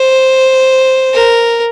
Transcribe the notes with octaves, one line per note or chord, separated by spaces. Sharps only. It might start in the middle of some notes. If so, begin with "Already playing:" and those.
Already playing: C5
A#4